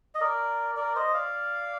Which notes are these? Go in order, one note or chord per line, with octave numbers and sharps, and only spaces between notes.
D#5
A#4 D5
A#4 D5
C5 D#5
D5 F5